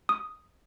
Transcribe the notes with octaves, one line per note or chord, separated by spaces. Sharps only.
D#6